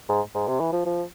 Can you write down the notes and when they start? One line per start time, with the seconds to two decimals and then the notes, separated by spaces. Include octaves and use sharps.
0.09 G#2
0.35 G#2
0.47 C3
0.60 E3
0.73 F3
0.86 F3